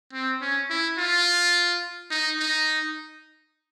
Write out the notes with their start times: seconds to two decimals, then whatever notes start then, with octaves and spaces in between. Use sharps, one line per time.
0.13 C4
0.42 C#4
0.70 E4
0.98 F4
2.11 D#4
2.39 D#4